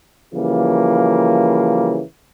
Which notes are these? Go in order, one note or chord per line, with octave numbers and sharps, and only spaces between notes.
C#3 E3 F3 G3 A#3